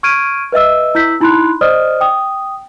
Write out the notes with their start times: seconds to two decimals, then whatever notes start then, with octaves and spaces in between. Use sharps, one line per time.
0.03 C#6 F6 G#6 D7 D#7
0.52 B4 D#5 E5 E6
0.95 E4 E6 G6 B6
1.20 D#4 E4 B5 C6 F#6
1.61 C5 D5 D#5 D#6 F6
2.01 G5 D#6